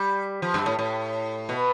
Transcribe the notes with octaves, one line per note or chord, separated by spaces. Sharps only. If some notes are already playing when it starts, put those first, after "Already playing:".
Already playing: G3
F3
G2
A2
A2
B2